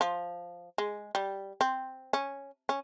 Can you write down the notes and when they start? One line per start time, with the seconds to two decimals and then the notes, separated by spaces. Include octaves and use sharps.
0.01 F3
0.78 G#3
1.15 G3
1.61 C4
2.13 C#4
2.69 C#4